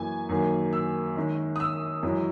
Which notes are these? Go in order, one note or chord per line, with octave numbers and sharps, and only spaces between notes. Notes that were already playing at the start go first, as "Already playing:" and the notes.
Already playing: F#2 E3 A#3 G#5
F#2 D#3 A#3
E6
D#3 G#3 C#4
D#6
E6
F#2 E3 G#3 C#4